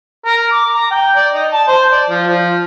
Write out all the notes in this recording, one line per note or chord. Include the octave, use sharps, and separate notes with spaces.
A#4
D6
A#5
G5
D5
D#4
A5
C5
D5
F3
F3